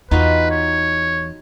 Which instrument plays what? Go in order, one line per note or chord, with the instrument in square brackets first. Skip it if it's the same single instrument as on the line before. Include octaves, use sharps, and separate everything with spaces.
[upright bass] E2 [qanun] D#4 F4 F#4 [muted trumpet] B4
[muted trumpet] C#5